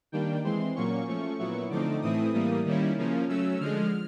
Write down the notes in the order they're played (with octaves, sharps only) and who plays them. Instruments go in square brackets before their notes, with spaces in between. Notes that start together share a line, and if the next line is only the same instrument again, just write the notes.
[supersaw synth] D#3 G3 A#3 D4 G5
E3 G#3 C4 C6
A#2 F#3 A#3 C#4 C#6
F3 A3 C#4
A#2 F#3 B3 E4
D3 F3 A3 C4 D#4 D6
A2 E3 A3 C4 E4 D#6
A2 E3 G3 A#3
D#3 G3 A#3 C#4 E4
C#3 F3 A#3 C#4
F#3 A3 C#4 E6
D3 F3 G#3 F6